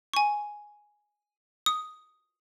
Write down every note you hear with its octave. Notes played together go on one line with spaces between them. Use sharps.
G#5 C#6
D#6